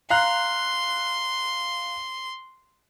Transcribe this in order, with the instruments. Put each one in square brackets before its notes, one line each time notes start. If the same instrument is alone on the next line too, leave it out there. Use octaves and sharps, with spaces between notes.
[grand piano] F5 A#5 F#6 [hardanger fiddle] C6